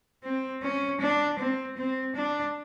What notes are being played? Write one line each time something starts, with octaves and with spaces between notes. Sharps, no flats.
C4
C#4
D4
C4
C4
D4